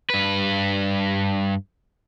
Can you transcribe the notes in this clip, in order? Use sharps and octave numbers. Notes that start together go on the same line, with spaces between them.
G2 B4